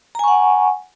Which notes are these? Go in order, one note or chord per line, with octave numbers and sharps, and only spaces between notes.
F#5 G#5 A#5 C#6